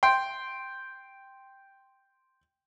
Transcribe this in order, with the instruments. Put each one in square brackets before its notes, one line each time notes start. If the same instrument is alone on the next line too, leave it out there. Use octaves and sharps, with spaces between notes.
[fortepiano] G5 C6